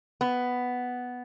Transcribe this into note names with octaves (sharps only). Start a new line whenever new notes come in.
B3